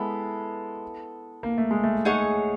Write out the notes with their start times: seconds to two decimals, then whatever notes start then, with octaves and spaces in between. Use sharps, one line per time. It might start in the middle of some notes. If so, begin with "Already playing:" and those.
Already playing: G#3 B3 E4 A4
1.43 A#3
1.58 A3
1.71 G#3
1.84 A3
2.05 D#4 G#4 C#5 F#5